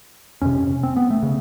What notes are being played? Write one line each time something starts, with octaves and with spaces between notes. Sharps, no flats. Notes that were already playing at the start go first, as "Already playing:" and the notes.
F2 C3 C#4
C4
B3
A3
C#3